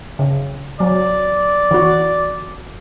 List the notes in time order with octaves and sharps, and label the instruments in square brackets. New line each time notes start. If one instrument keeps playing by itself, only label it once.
[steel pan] C#3
[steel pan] F#3 [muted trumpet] D5
[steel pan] E3 F#4